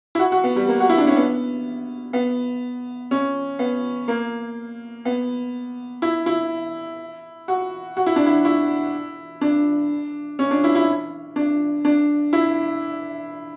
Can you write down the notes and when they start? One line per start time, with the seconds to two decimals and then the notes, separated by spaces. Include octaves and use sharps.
0.15 E4
0.19 F#4
0.32 F#4
0.44 B3
0.56 G3
0.68 A#3
0.80 F#4
0.90 E4
0.98 D4
1.07 C#4
1.17 B3
2.13 B3
3.11 C#4
3.59 B3
4.08 A#3
5.05 B3
6.02 E4
6.26 E4
7.48 F#4
7.97 F#4
8.06 E4
8.16 D4
8.26 E4
8.45 E4
9.41 D4
10.39 C#4
10.51 D4
10.64 E4
10.75 E4
11.36 D4
11.85 D4
12.33 E4